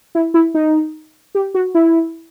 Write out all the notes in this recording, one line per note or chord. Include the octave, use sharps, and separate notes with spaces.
E4
E4
D#4
G4
F#4
E4